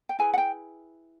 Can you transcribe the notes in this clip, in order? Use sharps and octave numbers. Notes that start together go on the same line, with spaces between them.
G5
E4 G#4 B4 G#5
F#5
G5